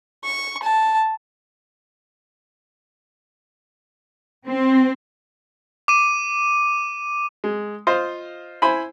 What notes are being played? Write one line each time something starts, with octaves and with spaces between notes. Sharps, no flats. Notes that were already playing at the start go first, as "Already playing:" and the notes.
C#6
A5
C4
D6 D#7
G#3
F4 C5 D#5 F5
E4 C5 G#5 B5